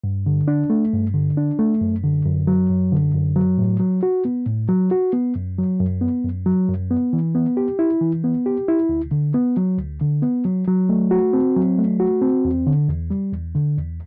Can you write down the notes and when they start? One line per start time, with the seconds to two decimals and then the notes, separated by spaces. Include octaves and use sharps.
0.04 G2
0.26 D3
0.48 D4
0.70 A3
0.93 G2
1.14 D3
1.37 D4
1.59 A3
1.81 F#2
2.03 D3
2.25 F#2
2.47 F#3
2.70 F#2
2.92 D3
3.15 F#2
3.36 F#3
3.58 A2
3.80 F#3
4.03 F#4
4.25 B3
4.47 A2
4.69 F#3
4.91 F#4
5.13 B3
5.36 F#2
5.58 F#3
5.80 F#2
6.01 B3
6.24 F#2
6.46 F#3
6.69 F#2
6.91 B3
7.13 E3
7.35 B3
7.57 G4
7.79 E4
8.01 E3
8.24 B3
8.46 G4
8.68 E4
8.89 D2
9.11 D3
9.34 B3
9.57 F#3
9.78 D2
10.01 D3
10.22 B3
10.45 F#3
10.68 F#3
10.89 A3
11.11 F#4
11.33 C4
11.56 F#3
11.78 A3
12.00 F#4
12.22 C4
12.45 E2
12.67 D3
12.88 E2
13.10 G3
13.33 E2
13.55 D3
13.77 E2